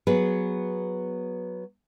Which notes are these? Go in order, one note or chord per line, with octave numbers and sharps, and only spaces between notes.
F#3 B3 G#4 B4